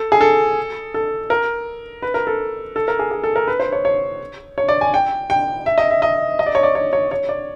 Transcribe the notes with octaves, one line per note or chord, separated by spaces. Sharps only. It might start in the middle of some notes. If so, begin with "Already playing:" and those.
Already playing: A4
G#4
A4
A4
A#4
B4
A#4
A4
A4
A#4
G#4
G#4
A4
A#4
B4
C5
C#5
C#5
C#5
D5
G#5
G5
G5
E5
D#5
E5
D#5
D#5
D5
C#5
D5
C#5
C#5
C#5
D5